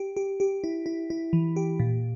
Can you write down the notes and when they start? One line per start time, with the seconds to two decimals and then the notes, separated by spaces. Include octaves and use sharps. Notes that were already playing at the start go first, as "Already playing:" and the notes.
Already playing: G4
0.17 G4
0.40 G4
0.64 E4
0.86 E4
1.10 E4
1.33 E3
1.56 G4
1.80 A#2